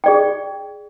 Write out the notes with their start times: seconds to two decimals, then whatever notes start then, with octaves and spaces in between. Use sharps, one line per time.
0.04 G#4 D5 G5